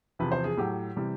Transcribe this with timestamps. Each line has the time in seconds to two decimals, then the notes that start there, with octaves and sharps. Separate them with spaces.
0.19 E2 C3 F3 B4
0.32 C5
0.44 G#4
0.57 A2 F#3 G4
0.96 C3 E3 G3